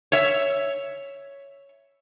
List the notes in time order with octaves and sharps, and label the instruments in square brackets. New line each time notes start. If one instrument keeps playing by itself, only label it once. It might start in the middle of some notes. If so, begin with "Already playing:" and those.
[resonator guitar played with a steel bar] C#5 E5